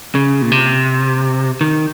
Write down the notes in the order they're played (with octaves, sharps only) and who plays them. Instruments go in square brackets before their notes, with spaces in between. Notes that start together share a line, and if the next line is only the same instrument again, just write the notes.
[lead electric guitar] C#3
A#2
C3
D#3